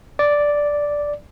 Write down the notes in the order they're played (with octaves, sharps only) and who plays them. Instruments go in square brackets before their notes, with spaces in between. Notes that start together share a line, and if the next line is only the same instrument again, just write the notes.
[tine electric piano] D5